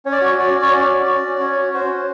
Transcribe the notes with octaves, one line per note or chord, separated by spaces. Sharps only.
C#4 C#5
D5
F#4 C#5
F#4 D5
C#4
C#5
C#4 D5
F#4
F#4
C#4
C#4 C#5
F#4
F#4 C5
C#4